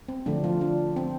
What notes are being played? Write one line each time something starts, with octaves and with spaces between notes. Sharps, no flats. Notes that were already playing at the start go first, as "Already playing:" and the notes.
C4
D3 F3 A3 D4
F3 F4
D4
C4